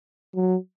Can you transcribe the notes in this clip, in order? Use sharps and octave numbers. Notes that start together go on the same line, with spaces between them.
F#3